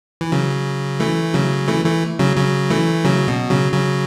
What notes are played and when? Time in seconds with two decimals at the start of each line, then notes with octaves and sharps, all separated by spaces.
0.21 E3
0.32 C#3 F#3
1.00 E3 A3
1.34 C#3 F#3
1.68 E3 A3
1.85 E3 A3
2.19 C#3 F#3
2.36 C#3 F#3
2.70 E3 A3
3.05 C#3 F#3
3.28 B2
3.50 C#3 F#3
3.72 C#3 F#3